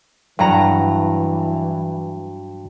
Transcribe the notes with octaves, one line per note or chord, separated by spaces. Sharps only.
G2 E3 F#3 F#5 A#5